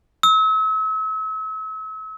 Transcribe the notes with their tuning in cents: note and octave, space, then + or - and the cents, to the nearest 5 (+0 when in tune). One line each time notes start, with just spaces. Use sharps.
E6 -40